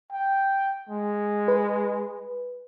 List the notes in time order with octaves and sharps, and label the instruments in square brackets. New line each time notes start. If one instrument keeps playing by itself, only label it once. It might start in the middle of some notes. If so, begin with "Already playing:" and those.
[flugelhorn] G5
G#3
[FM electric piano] B4